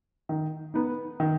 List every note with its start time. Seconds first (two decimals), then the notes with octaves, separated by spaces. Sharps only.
0.29 D#3
0.74 B3 D#4
1.20 D#3